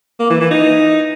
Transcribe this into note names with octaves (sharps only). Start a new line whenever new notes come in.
A#3
E3
E3
D#4